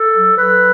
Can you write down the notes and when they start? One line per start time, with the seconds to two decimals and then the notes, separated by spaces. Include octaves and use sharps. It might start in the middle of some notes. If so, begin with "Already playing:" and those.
Already playing: A4
0.14 F#3
0.37 F#3 B4